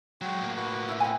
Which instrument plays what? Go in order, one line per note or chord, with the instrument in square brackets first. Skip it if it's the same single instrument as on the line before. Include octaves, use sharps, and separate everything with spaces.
[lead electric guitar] F#3 G#3 [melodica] F#4 G5
[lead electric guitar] A2 A#3
[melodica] F#4 B4
[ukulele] E4 E5
[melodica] B3 C4 [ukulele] G5 G#5